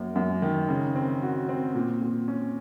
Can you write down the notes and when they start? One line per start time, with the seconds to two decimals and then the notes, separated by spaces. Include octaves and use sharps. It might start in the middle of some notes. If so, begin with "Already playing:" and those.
Already playing: F#2 A#3
0.16 F#2
0.42 D#3
0.69 C#3
0.95 C4
1.22 F#4
1.49 C4
1.75 A#2
2.01 A#2
2.28 C#4